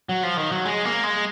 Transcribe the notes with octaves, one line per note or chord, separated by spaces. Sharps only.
F#3
F3
D#3
F#3
G#3
A#3
G#3